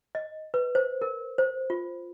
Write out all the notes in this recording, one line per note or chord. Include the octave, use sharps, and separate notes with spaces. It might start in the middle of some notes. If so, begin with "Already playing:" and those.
D#5
B4
C5
A#4
C5
F4